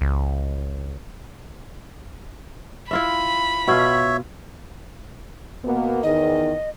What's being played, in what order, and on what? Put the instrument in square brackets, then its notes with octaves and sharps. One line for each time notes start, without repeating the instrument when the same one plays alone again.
[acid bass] C#2
[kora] E4 F4 E5 [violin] B5
[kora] B2 F4 [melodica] C#5 E5
[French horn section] B2 A#3 B3
[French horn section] E2 D#3 [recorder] D#5